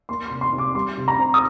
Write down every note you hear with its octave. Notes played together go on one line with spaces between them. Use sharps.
A#3 C6
C6
C3
C6
C3
D6
G3 C6
C3
A#5
C4
D#6